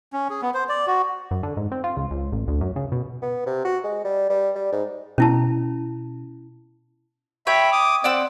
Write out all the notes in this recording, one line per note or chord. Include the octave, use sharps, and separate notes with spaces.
C#4
G#4
B3
C5
D5
F#4
F#2
D3
G#2
C4
F4
C#2
C#2
A1
D2
F#2
C#3
B2
B3
C3
F#4
G#3
G3
G3
G3
G#2
B2 C#4 E4 A5
C#5 E5 G5 B5
D6 D#6
C4 D5 F#5 E6